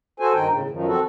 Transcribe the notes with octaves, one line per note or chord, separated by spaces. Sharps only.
F#4 A4 C5 G#5
G2 D#3 D#4 G5
A2 C#3
F#2 D#3 F3
C4 F#4 A4